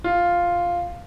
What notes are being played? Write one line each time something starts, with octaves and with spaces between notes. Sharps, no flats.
F4